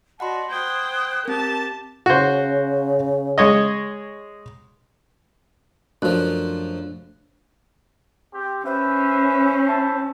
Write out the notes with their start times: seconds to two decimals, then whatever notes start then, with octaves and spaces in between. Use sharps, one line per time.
0.20 F#4 D5 D#5 F#5 A5 B5 C6
0.50 C5 G5 D#6 F#6 G#6
1.25 C4 G4 A#4 A5
2.06 C#3 F#4 C5
3.38 G#3 C#5 D#5
6.02 F#2 F3 A3 D4 F#6
8.33 C4 G4
8.66 C#4 B4 C5 E5
9.68 E4 E5 A5